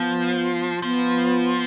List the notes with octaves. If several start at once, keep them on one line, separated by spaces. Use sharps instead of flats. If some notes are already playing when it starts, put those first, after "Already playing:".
Already playing: F3 B3
F3 B3